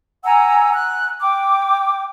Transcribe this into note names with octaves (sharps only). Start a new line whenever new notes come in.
F#5 G#5 A#5 E6
F#6
G5 D6